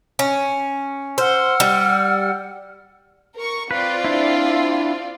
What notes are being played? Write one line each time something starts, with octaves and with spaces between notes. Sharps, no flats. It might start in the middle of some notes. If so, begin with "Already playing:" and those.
C#4
C5 F#5 E6 F6
G3
A#4 C#6
C4 F4 B4 D5
D4 E4